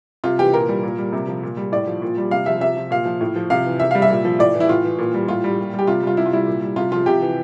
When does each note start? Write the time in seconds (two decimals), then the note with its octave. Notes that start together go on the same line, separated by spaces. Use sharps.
0.24 C3 F4
0.39 E3 G4
0.54 A#2 A#4
0.69 G3
0.83 A#2
0.98 G3
1.13 C3
1.28 F3
1.43 A#2
1.57 G3
1.72 A2 D5
1.87 F3
2.02 A#2
2.18 G3
2.31 C3 F5
2.46 F3 E5
2.61 C3 E5
2.76 F3
2.91 A#2 F5
3.05 F3
3.21 A2
3.36 F3
3.50 C3 F5
3.66 E3
3.80 C3 E5
3.91 G3 F5
4.02 E5
4.10 A#2
4.25 F3
4.39 A2 D5
4.54 E3
4.60 E4
4.69 A2 F4
4.84 E3
4.98 A#2
5.14 G3
5.28 A2 F4
5.44 G3
5.59 A#2
5.74 G3
5.79 G4
5.87 C3 F4
6.03 G3 F4
6.17 C3 E4
6.26 F4
6.33 G3 E4
6.47 A#2
6.62 G3
6.76 C3 F4
6.92 F3 F4
7.06 C3 G4
7.21 E3